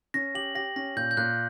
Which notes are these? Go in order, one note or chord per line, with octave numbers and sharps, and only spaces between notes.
C#4 A#6
G4 F#7
G4 A#6
C#4 A#6
A#2 G6
G6
A#2 F#6